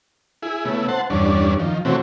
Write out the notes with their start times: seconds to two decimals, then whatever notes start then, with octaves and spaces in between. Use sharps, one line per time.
0.43 E4 G#4
0.65 C#3 A3 B3 E4
0.88 C5 F#5 A5
1.10 E2 G2 C#4 D4
1.60 D#3 F3
1.85 C3 E3 A3 C4 C#4 F#4